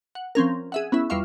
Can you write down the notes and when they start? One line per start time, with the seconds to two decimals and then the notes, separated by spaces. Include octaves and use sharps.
0.15 F#5
0.35 F3 C4 C#4 A#4
0.72 G#4 E5 F#5
0.92 B3 C#4 E4 E5
1.10 E2 G3 F4 E5 F5 C#6